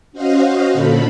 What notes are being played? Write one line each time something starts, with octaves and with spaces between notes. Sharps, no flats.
C#4 F#4 C5 D#5 F5
A#2 D3 A4 B5